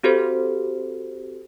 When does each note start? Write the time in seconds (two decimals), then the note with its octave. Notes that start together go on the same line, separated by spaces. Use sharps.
0.03 C4 F#4 G4 A4 C5